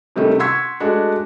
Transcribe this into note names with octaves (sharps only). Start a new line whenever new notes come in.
C3 D#3 G3 A3 C#4
F#5 C6 C#6 E6 G#6 B6
G#3 A3 D4 F#4